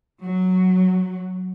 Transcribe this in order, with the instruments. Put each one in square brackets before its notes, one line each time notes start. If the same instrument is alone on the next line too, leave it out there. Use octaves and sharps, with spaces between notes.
[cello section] F#3